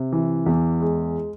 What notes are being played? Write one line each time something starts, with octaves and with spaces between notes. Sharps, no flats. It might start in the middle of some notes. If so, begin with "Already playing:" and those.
Already playing: C3
E3
E2
G#3